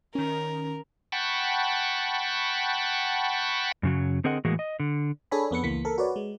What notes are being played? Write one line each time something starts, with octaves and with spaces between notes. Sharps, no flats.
D#3 C#4 A#4
F#5 G5 A5 B5 C#6
F#2 C#3 F#3
D3 C4 G#4 A#4 D#5 F#5
A2 E3 G#3 A#3 F#4 G#4
D#5
D3
D4 G#4 A4 C#5 G#5 B5
F2 B3 B4 C#7
C#2 E3 A#3 B6 C#7
A4 A#4
F#4 B4 C#5 D5
G#3